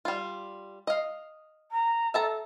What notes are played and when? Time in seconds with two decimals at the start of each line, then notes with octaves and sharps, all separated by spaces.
0.05 G3 F4
0.87 D#5 F5
1.72 A#5
2.14 A4 E5 A5 A#5